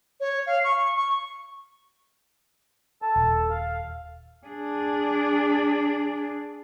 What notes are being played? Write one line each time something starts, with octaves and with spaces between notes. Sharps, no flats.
C#5
F5
C#6
C#6
A4 A5
D#1
F5
D4 G#4